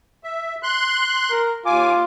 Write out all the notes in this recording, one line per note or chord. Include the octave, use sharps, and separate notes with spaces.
E5
C6 F#6
A#4
D#2 F4 G#5 D6